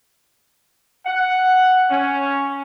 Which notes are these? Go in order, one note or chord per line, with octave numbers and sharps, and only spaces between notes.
F#5
C#4